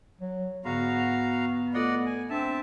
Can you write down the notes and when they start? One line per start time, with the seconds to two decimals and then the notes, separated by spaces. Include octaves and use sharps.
0.21 F#3
0.65 G#2 D3 B3 F#4 F5 A#5
1.74 A3 F4 A4 D5 D#5 F#5
2.06 G#5
2.30 C4 D4 E5 A5